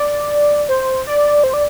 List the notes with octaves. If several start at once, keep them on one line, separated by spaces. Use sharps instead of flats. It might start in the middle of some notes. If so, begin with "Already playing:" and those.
Already playing: D5
C5
D5
C5
D5